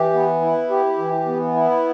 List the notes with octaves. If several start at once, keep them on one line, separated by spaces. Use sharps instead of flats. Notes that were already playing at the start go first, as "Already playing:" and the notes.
Already playing: E3 G4
B3
E4
G4
E3
B3
E4